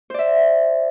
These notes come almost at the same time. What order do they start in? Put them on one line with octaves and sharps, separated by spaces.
C5 D5 E5